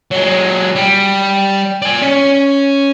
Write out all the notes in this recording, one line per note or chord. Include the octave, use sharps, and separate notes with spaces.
F#3 G#3
G3
D5 G#5
C#4